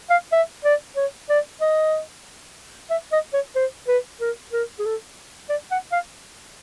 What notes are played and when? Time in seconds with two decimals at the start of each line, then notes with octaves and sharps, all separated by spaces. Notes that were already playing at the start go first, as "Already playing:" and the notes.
0.10 F5
0.32 E5
0.64 D5
0.96 C#5
1.29 D5
1.61 D#5
2.90 E5
3.12 D#5
3.33 C#5
3.55 C5
3.88 B4
4.21 A#4
4.53 A#4
4.79 G#4
4.85 A4
5.49 D5
5.71 F#5
5.92 F5